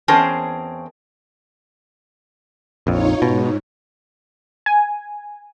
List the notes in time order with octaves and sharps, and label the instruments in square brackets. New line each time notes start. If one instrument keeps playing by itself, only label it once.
[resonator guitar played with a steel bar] E2 C4 C#4 G#4 A#4 A5
[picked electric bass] A#1 F2 [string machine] D#4 F4 C#5
[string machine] G#2 [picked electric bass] B2
[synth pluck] G#5